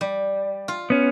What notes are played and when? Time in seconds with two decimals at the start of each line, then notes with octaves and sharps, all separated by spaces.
0.01 G3
0.68 F4
0.90 B3 C#4